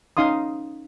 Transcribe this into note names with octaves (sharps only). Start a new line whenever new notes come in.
C#4 D#4 F5 C6 D#6